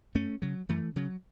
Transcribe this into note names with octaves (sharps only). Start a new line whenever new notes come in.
F#2 A3 C#4
C#3 F#3
F#2 E3 A3
C#3 F#3